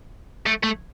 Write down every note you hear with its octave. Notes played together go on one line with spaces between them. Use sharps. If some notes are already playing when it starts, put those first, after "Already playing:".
A3
A3